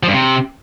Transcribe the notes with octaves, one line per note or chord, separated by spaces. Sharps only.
F3
G2
C3